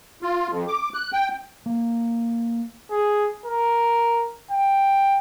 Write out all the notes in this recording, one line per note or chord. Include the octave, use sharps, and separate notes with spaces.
F4
F2
D6
F#6
G5
A#3
G#4
A#4
G5